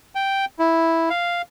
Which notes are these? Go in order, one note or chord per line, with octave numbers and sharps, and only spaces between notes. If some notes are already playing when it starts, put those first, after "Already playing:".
G5
E4
F5